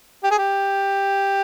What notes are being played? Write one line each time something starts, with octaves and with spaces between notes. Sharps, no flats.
G4
G#4
G4